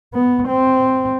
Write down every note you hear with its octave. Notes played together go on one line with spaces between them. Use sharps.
B3
C4